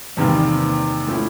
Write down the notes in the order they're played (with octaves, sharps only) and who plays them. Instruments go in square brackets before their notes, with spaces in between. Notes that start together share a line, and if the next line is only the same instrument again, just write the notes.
[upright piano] E2 C3 D#3 G3 A#3
A2 F3 A3 C#4 E4